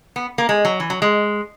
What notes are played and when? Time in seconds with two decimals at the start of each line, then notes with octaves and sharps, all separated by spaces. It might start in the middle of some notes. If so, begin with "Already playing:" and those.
0.16 B3
0.38 A#3
0.49 G#3
0.65 F#3
0.80 E3
0.90 F#3
1.02 G#3